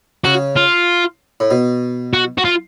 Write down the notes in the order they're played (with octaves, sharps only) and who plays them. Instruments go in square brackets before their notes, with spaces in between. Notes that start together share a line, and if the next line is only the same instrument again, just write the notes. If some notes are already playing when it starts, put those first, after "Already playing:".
[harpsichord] C#3 [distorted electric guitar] F#4
[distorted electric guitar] F4
[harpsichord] A2
B2
[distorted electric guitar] F#4
F#4
F4